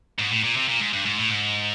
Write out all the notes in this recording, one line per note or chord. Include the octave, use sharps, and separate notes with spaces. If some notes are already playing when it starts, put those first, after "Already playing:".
G#2
A2
A#2
C3
A#2
G#2
G2
G#2
A2
G#2